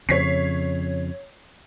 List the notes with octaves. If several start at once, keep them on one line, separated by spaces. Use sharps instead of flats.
F2 C#3 C#5 B6 C7